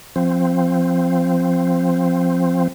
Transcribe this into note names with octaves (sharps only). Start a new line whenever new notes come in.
F3 C4